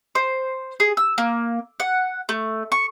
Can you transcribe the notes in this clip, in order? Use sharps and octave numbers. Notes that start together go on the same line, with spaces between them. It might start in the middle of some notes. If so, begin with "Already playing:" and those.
C5
G#4
E6
A#3
F#5
A3
C#6